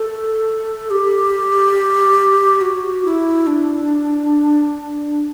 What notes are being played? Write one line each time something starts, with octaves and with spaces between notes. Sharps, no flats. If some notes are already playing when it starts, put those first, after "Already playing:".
Already playing: A4
G4
F#4
E4
D4